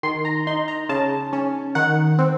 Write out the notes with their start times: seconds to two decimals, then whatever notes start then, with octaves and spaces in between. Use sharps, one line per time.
0.03 D#3 C6
0.25 A#5
0.47 D#4 C6
0.68 A#5
0.89 C#3 A5
1.33 C#4
1.75 D#3 F#5
2.19 C4